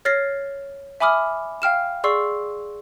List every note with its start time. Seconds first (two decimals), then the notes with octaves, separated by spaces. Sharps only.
0.05 C#5 F6 A6 A#6 C7
1.00 E5 G#5 B5 D6 D#6 F6
1.62 F5 G5 F6 E7
2.04 G#4 D5 C6 C#6 E6 C7